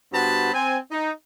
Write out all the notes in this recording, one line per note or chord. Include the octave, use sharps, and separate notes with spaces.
G2 B3 F#4 C5 A5 B5
C4 G#5
D#4